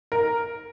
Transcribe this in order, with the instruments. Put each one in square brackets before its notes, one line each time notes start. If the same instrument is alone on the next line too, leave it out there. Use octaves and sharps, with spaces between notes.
[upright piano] A#4